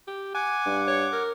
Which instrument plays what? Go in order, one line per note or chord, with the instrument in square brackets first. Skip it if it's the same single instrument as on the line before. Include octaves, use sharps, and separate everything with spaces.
[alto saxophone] G4
[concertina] F#5 D6 [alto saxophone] G#5
[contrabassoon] G2
[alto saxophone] C#5
A#4